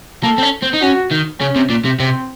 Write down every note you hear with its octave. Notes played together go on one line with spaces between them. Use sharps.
A#3 A4
C4
C#4
C4
D#4
C#4 F#4
D#3
C#3 C#4
C3
A#2
C3
C3 C4